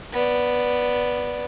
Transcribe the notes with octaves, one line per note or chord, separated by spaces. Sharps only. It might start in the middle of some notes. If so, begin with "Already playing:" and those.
B3 D5